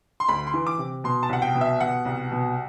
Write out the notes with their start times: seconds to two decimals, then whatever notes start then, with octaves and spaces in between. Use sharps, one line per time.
0.20 C6
0.28 D2 B5
0.47 C6
0.54 E3
0.67 D6
0.78 C3
1.04 B2 C6
1.23 A5
1.29 C2 F#5
1.42 G5
1.55 B2
1.61 E5
1.80 B2 F#5
2.05 C2
2.31 B2